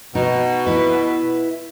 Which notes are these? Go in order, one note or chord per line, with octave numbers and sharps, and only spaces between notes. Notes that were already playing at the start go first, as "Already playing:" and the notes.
B2 D#4
E4 B4